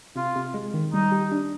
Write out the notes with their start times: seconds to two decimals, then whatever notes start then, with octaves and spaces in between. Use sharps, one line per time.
0.16 C3 F4
0.36 C3
0.54 G#3
0.74 D#3
0.93 G3 D#4
1.12 G4
1.32 D4